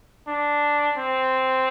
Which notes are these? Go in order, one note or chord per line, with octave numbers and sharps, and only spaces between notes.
D4
C4